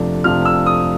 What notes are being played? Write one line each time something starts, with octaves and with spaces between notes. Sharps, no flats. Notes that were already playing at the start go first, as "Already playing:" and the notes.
Already playing: F2 C3 F3 A3 D4
F2 C3 F3 A3 D4 F6
E6
D#6